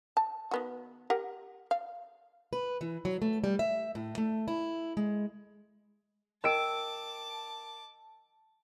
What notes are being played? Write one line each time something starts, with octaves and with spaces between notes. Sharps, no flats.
A5
D#3 B3 F#4
G4 A#4 F#5
F5
B4
E3
F#3
A3
G3
E5
A2
A3
E4
G#3
A#4 D#5 G5 A5 D6 E6 D7